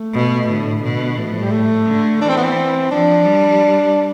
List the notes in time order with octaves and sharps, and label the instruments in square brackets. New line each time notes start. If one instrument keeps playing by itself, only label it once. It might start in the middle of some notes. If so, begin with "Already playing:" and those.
Already playing: [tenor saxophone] A3
[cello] B2
[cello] A2 [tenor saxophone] D3
[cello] B2
[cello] A2 [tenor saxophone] E3
[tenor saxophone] F3
G3
A3
[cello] D3
[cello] E3 [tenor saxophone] D4
[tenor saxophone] C4
B3
C4
[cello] F3 [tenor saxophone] D4
[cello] G3